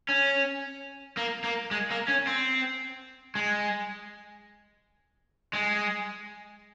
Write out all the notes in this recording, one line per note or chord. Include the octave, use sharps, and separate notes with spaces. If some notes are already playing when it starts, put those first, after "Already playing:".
C#4
A#3
A#3
G#3
A#3
C#4
C4
G#3
G#3